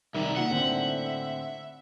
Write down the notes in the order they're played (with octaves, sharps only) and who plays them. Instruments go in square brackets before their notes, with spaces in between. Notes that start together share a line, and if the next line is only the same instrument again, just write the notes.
[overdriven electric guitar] C2 D#3 [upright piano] G3 [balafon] D#4 A#4 [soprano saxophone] E5
[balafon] A#3 D#4 F4 [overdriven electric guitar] F#5
[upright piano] A2 D3 C4